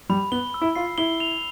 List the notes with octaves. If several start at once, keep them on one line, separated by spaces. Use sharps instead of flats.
G3 B5
B3 G7
E6
E4
F4 C7
E4 G7
F7